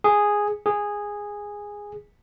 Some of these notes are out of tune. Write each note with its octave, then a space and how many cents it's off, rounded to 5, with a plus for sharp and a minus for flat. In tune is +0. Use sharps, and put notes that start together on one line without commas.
G#4 -5
G#4 -10